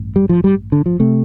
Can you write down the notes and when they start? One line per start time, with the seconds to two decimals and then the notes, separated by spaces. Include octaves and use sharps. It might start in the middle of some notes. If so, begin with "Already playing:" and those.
Already playing: A1 G2
0.16 G3
0.29 F3
0.44 G3
0.72 D3
0.86 F3
1.00 C3 A3